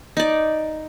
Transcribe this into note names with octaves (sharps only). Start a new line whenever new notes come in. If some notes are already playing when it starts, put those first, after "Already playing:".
D#4 D5